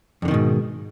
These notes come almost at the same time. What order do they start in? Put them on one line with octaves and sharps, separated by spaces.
F2 D3 D#3 B2 G#2